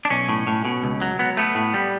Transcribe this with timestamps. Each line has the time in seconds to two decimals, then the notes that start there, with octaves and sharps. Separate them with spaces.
0.05 D4
0.10 B1 C#4
0.29 A2
0.47 A2
0.65 B2
0.84 C#2
1.02 F#3
1.19 F#3 B3
1.37 A3 B3
1.55 A2
1.74 G3